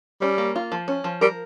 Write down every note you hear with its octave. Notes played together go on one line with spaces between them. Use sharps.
G3 C#4
A#3
F4
F3
C#4
F3
G3 A#4